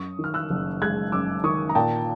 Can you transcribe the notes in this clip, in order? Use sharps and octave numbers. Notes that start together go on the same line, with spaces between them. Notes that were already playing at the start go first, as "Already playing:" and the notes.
Already playing: F#2 C#6 D#6
D#3
F6
E6 F#6
F#1
G#3 F#6 G#6
F#2 D6 E6
D#3 C#6 D#6
A#5
A#2 G5 A5